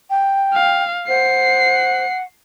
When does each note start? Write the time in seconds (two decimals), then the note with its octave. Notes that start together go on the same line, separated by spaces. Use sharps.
0.10 G5
0.54 F5
1.08 C5 F#5 C7